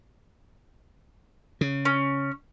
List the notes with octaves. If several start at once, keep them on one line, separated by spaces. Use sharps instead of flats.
C#3
C#4